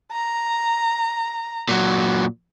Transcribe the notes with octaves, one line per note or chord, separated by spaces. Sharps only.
A#5
A#2 F#3